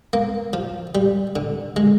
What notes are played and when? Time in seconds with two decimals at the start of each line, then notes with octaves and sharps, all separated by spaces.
0.13 A#3
0.53 F3
0.95 G3
1.36 D3
1.76 G#3